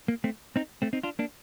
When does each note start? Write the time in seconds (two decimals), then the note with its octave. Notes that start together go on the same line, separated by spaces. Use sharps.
0.08 A#3
0.24 A3 C4
0.56 C4 D#4
0.82 A3 C4
0.93 C4 D#4
1.03 D4 F4
1.19 A#3 D4